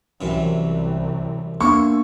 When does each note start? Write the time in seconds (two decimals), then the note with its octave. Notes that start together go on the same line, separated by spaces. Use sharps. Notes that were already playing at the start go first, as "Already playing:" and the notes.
0.21 C2 F#2 C3 E3
1.61 A#3 B3 D4 A4 A#4 C#6